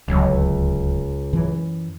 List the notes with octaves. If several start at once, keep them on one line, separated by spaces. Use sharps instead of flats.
D1 C#2 F#3
F#2 E3